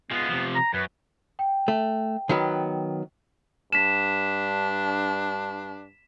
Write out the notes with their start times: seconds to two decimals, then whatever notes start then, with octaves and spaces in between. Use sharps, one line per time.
0.11 F3 G#3 B3
0.29 C3 F3
0.55 A#5
0.74 F#2 B4
1.39 G5
1.68 A3
2.29 D#3 F#3 B3
3.73 G2 D4 B6 E7